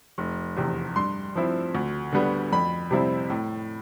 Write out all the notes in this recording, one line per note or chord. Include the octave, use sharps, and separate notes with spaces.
F1
E2 C3
G2 C6
F3 C4 E4
D2
D3 G3 B3
F2 B5
C3 G3 C4 E4
A2